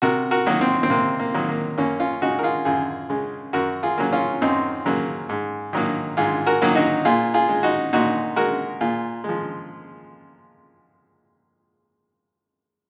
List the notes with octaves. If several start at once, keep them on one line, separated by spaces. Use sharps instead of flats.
C3 F#4 A#4
F#4 A#4
D#3 F#3 A#3
C4
C4
C3 A#3
A#3
D#3 F#3 A#3
A#3
F#2 A#3 C#4
C#4 F4
C#3 G#3 D#4 F#4
A#4
F4 G#4
F#2 F4 G#4
C#3 G#3
F#2 F#4 A#4
F4 G#4
C#3 F#3 A#3
C#4 F4
F#2 C4 D#4
C#3 F#3 A#3
G#2
D#3 F#3 A#3
G#2 F4 G#4
F#4 A#4
D#3 F#3 A#3
D#4 F#4
A#2 F4 G#4
F4 G#4
G#3
D#4 F#4
A#2 D#4 F#4
G#3 F#4 A#4
A#2 F4 G#4
F3 G#3